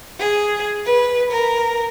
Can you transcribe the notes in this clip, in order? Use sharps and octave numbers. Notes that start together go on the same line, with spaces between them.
G#4
B4
A#4